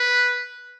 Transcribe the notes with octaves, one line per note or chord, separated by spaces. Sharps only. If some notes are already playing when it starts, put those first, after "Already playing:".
Already playing: B4